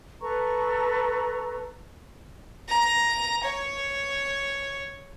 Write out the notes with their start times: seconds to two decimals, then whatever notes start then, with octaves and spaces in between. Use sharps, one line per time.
0.21 A4 B4 A#5 C#6
2.69 A#5
3.44 C#5